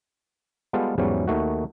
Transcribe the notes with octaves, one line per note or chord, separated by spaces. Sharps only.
G3 G#3 B3 F4 G4 A4
E2 G#2 E3 F#3 G3 C#4
D#2 D#3 A3 F#4